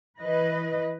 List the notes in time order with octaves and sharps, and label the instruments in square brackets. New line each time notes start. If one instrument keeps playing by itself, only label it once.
[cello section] E3 B4 D#5